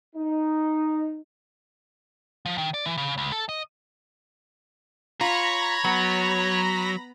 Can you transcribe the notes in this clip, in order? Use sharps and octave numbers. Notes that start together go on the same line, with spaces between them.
D#4
F3
D#3
D5
E3
C#3
C#2
A4
D#5
F4 C#5 A#5 B5 A#6
F#3 B3